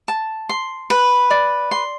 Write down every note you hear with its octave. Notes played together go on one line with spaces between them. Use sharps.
A5
C6
B4
D5
C6